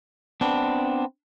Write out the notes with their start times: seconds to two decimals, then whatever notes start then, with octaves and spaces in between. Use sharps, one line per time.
0.41 B3 C4 D4